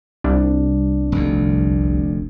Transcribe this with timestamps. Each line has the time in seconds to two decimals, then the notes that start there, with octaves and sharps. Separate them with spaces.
0.24 C2 D4
1.12 F1 D2